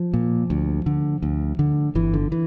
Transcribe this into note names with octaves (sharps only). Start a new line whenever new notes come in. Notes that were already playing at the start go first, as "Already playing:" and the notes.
Already playing: F3
A#2
D2
D3
D2
D3
G1 E3
D3
E3